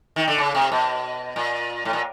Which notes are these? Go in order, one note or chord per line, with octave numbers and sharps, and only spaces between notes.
D#3
D3
C#3
C3
B2
A#2
A2
A#2